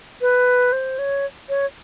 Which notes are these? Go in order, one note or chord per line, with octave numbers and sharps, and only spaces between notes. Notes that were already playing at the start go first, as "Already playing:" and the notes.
B4
C5
C#5
C#5